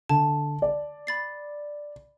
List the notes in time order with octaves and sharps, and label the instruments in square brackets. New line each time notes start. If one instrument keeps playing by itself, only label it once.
[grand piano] D3 [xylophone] A5
[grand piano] D5
[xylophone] B5 A6 C7